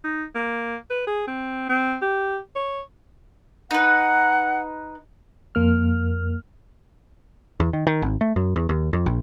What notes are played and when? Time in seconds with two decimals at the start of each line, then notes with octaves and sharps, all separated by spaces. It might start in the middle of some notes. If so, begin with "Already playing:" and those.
0.04 D#4
0.35 A#3
0.90 B4
1.07 G#4
1.28 C4
1.69 C4
2.02 G4
2.56 C#5
3.71 D#4 B4 F#5
5.55 F2 A#3 F6
7.60 E2
7.73 D#3
7.87 D#3
8.02 G#1
8.21 A3
8.36 F#2
8.56 E2
8.69 D#2
8.93 F2
9.06 A#1